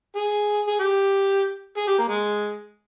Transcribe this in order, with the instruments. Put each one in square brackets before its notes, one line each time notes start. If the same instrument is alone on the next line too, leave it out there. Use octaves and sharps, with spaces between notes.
[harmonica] G#4
G#4
G4
G#4
G4
A#3
G#3